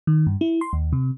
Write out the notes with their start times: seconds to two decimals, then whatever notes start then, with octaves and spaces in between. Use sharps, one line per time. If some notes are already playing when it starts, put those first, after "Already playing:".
0.07 D#3
0.27 G2
0.41 E4
0.61 C6
0.73 D#2
0.93 C3